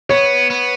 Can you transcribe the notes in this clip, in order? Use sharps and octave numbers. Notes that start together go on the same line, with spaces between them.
B3 C#5
B3